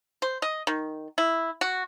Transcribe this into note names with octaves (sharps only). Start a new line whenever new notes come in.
C5
D#5
D#3
E4
F#4